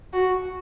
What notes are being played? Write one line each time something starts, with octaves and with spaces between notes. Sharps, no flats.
F#4